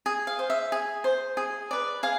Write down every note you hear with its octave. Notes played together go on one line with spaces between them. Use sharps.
G#4
F5
C5
E5
G#4
C5
G#4
B4 D5
G#4 F5